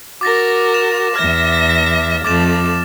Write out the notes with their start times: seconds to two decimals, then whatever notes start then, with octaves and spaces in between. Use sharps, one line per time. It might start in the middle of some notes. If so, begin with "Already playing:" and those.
0.21 F#4 A#4 D6 A6 A#6
0.74 E7
1.15 E2 E5 F6 A#6
2.25 F2 A3 D6 A6 E7